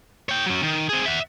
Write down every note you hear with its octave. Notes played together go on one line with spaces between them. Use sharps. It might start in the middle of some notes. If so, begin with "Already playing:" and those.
C#5 G5
F#3 C#4
D#3
C4 G#4
E5 F#5